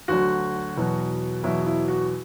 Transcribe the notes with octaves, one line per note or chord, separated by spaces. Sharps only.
D2 D3 F#3 F#4
E2 B2 F#3
E2 B2 F#3 E4
E4
F#4